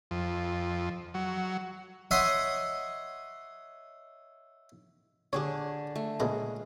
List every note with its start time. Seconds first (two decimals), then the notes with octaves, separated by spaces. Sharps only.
0.11 F2
1.14 F#3
2.11 C#5 D#5 E5 F#5 C6 D#6
5.33 D3 G4 G#4 C#5
5.96 A3
6.20 A#1 C#3 G#3 A#5